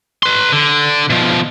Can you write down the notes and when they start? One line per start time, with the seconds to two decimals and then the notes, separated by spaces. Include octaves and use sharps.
0.23 B4 C6
0.52 D3
1.10 B2 F3